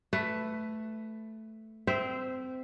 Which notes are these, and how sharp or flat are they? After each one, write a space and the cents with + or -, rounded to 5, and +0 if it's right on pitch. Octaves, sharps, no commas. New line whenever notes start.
A3 +0 B4 +15
C4 -20 C5 -10 E5 +0